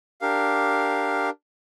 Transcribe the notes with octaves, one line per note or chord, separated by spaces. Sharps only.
D4 G4 A#4 F5